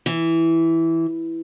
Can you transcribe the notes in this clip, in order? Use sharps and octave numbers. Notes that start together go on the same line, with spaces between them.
E3